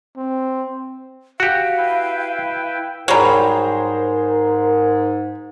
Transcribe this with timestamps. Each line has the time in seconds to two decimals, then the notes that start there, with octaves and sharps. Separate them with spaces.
0.17 C4
1.40 F#4 G4 F5
1.77 E4 B4 G5
3.08 G#2 F#3 G3 G#4 A#4 C5 A#5